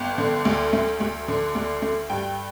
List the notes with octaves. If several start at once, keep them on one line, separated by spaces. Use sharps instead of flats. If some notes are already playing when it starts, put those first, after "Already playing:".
Already playing: G1 G5
D3
D2
A3
D2
D3
D2
A3
G2 G5